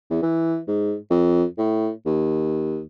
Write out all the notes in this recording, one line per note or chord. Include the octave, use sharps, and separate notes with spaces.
E2
E3
G#2
F2
A2
D#2